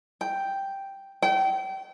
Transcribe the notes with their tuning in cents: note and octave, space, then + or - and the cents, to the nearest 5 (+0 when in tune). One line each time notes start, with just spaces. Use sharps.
G5 +0
G5 -30